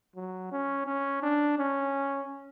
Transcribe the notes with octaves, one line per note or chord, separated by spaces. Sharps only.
F#3
C#4
C#4
D4
C#4